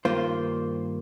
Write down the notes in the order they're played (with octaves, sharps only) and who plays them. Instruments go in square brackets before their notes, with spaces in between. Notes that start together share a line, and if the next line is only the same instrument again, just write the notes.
[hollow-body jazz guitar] G2 D#3 A#3 F4 C5